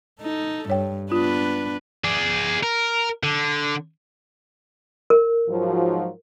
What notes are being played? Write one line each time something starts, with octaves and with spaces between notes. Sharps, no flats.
D#4 A4
G2 C#5 G5
B3 D4 F4 B4
G#4 D5
A#4
D3
A#4
G#2 F3 F#3